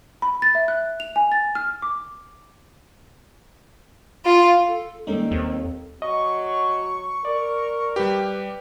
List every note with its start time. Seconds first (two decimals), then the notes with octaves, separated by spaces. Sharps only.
0.22 B5
0.42 A6
0.55 E5
0.68 F#6
1.00 F7
1.16 G#5
1.32 A6
1.55 F6
1.82 D6
4.24 F4
4.67 A4
5.07 D#3 G3 G#3 A#3 C#4 D#4 A4
5.31 D#2 C4
6.02 F#3 D#5 C#6
7.25 A#4 D5
7.96 G3 G4 B4